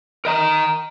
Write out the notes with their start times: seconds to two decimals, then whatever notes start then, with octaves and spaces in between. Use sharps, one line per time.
0.25 A#4 D#5 A#5